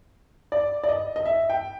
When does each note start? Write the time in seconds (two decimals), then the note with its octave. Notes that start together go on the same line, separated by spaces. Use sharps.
0.52 D5
0.84 D5
0.89 D#5
1.16 D#5
1.26 E5
1.50 G5